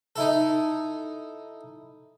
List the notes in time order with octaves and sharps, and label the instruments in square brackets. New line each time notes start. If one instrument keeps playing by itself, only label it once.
[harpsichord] D#4 E4 A4